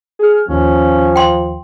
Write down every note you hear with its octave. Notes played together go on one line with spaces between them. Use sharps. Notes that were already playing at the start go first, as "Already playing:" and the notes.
G#4 F6
D#2 F3 C#4
G5 C6